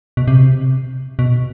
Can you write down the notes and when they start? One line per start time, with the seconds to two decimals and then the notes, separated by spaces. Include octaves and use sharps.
0.17 B2
0.28 C3
1.19 B2